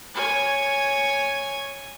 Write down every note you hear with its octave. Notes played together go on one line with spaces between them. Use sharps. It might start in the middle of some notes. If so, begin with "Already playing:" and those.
C#5 G#5